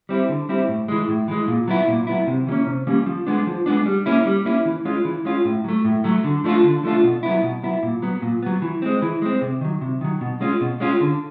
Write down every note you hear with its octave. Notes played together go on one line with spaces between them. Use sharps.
G3 C4 E4
D3
G3 C4 E4
A2
E3 G#3
A2
E3 G#3
A#2
F#3 B3 E4
A#2
F#3 B3 E4
C3
E3 G3 A#3 C#4
C3
E3 G3 A#3 C#4
F3
G#3 B3 D4
F3
G#3 B3 D4
G3
A#3 C#4 E4
G3
A#3 C#4 E4
E3
G#3 C#4 F4
E3
G#3 C#4 F4
A2
F#3 A3
A2
F#3 A3
D3
F3 A3 D4 F4
D3
F3 A3 D4 F4
B2
F#3 B3 E4
B2
F#3 B3 E4
A#2
F#3 B3
A#2
F#3 B3
E3
G#3 C4
E3
G#3 C4
C3
D#3 F#3
C3
D#3 F#3
B2
G#3 C#4 F4
B2
G#3 C#4 F4
D3